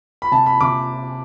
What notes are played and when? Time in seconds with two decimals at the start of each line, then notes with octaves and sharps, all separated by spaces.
0.22 B5
0.31 C3 A5
0.46 B5
0.61 C3 D6